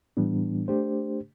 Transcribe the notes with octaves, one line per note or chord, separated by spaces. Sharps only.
A2 E3 G3 B3 D4
A3 D4 G4 C5